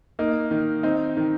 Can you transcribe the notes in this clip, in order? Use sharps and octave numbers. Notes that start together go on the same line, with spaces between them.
A#3 D#4
D#3
C4 D#4
D#3